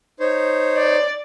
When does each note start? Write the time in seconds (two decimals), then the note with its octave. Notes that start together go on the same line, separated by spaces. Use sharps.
0.20 D#4 C5 C#5
0.77 D5